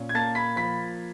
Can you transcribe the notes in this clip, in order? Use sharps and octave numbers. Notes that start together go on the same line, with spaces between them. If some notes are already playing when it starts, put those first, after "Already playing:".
Already playing: A#2 C#4
G#6
A#3 A5 A6
B5 B6
F3 B5 B6